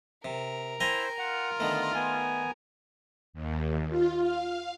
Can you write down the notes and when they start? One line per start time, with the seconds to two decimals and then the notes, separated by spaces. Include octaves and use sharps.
0.25 C3 A#4
0.80 E4 C5 G5 G#5 A#5
1.19 F4 F#5
1.60 D3 D#3 A3 B3 A#5
1.95 B3 G#5
3.33 D#2
3.89 F4
4.19 F5